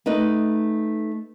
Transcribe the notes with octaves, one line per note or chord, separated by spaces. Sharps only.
A3 D#4 B4 D#5